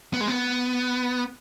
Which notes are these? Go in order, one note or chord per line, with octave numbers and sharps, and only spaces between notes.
B3
G#3
B3